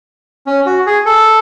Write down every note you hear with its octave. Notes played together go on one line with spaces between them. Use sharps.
C#4
F#4
G#4
A4